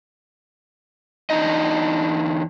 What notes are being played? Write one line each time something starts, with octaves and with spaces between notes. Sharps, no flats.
E2 D4 D#4 D#5